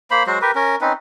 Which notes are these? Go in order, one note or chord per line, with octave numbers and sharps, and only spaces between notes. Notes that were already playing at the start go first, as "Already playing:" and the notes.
A#3 C5 B5
F#3 G#3 F#4 C5
G4 A#4 B4
C#4 A#4
C4 C#4 D#4 B4